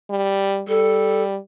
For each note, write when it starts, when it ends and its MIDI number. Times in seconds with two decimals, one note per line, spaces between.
0.10 0.63 55
0.68 1.38 55
0.68 1.23 69